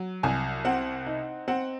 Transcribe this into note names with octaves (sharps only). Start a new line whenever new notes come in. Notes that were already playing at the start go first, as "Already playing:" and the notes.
Already playing: F#3
C2 G#5
C4 F#5
D#4
C4 F#5